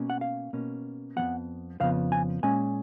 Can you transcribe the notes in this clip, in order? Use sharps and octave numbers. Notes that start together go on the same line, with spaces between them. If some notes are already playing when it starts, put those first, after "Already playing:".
Already playing: B2 A#3 C#4
F#5
F5
B2 A#3 C#4
F2 C#3 F3 B3 F#5
F2 C#3 F3 B3 F5
G#5
A#2 G#3 C#4 G#5